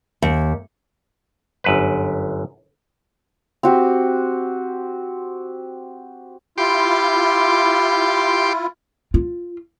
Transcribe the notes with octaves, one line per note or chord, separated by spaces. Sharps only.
D#2
G1 F#2 B4
C4 F#4 G4
E4 F4 G4 C6 D6
F4